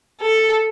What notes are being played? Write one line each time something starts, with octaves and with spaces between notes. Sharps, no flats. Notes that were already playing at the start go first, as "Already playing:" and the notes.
A4